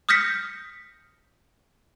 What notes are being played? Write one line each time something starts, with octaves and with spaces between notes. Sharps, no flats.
D#6 F6 G6 A#6 B6 C#7